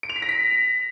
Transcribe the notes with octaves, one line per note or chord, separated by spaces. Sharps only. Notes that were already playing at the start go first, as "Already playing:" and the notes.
D7
F7
B6
A#6
B6